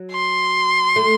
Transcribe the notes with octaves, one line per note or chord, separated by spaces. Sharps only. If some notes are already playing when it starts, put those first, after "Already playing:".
Already playing: F#3
C6
A3